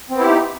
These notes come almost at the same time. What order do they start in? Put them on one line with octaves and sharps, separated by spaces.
C4 B3 E4 G4 D#4